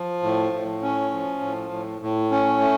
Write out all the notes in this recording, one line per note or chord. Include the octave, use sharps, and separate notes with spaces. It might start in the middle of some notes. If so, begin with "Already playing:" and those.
Already playing: F3
A2
A2
C#4
F3
A2
A2
A2
C#4
A3